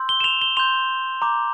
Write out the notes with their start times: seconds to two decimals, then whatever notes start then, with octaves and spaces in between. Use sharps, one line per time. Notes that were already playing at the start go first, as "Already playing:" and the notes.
Already playing: C6 E6 G6
0.09 G7
0.20 E7
0.24 F7
0.42 G7
0.57 C6 G6 F7
1.22 A#5 D6 G6